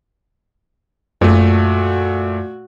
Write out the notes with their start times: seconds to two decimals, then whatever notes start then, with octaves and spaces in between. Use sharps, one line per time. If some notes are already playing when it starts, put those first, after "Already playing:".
1.21 F#2 A#2 A3 F#4